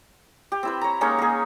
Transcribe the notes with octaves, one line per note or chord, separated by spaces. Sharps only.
G4
C4 E4 B4
C#5 A#5
G#3 A#3 C#4 D#4
A#3 G#4